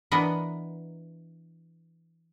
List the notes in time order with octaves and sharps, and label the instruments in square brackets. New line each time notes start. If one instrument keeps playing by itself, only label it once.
[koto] E3 B3 D4 A#4 D#5 F#5